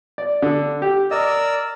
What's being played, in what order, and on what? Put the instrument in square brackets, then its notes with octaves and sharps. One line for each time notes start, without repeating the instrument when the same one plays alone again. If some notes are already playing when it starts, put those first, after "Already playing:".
[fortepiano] D5
D3
G4
[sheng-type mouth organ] A#4 D5 E6 [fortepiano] D#5